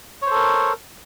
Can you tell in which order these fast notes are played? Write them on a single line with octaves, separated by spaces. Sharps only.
C#5 C5 A4 A#4